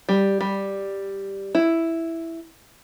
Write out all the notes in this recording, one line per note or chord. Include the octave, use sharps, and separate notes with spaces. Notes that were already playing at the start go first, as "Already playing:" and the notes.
G3
G3
E4